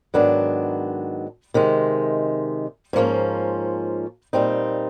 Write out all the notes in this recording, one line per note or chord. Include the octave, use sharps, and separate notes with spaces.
G#2 D#3 F#3 B3 D4
C3 D#3 G#3
G#2 F3 A#3 C#4
A#2 G3 C4 D#4